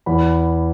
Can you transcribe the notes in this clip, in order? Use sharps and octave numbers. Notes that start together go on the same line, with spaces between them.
E2 B5